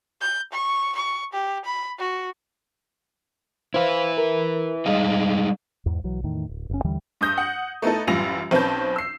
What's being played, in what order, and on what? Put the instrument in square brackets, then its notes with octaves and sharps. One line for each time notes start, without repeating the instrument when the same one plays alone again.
[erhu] G6
C#6
C#6
G4
B5
F#4
[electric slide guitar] E4 B4 [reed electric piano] C5 F5
[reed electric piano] A#4
[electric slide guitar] G3 G#3 D#4 [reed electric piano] D#5 F5
[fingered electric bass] E2 G#2
B1 E3 F#3
E2 A2 D#3
D1
F#1 C#4
D#2 D3 E3 G3
[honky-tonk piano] G2 D#6 G6 A#6
F#5
A3 B3 D#4 E4 A4
A1 F#2 G3 F4 A#6 F7
B1 C4 C#4 B4 A5 G6
E6 C7